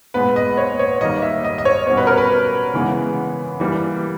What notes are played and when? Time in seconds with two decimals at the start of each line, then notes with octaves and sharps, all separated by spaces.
0.14 A#2 G#3 B3 B4
0.36 D#5
0.57 C#5
0.79 C#5
1.01 D#3 G3 A#3 D#5
1.22 E5
1.45 D#5
1.58 D#5
1.65 C#5
1.87 B2 G3 C#4 C#5
1.97 B4
2.07 A#4
2.17 B4
2.74 C#3 E3 G#3 B3
3.60 E3 G3 A#3